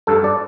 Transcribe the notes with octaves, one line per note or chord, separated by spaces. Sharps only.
G2 A4
D5